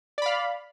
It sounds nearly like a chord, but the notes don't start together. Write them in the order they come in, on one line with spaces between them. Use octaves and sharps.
D5 B5 F5